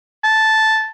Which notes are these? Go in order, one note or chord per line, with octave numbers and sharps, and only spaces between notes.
A5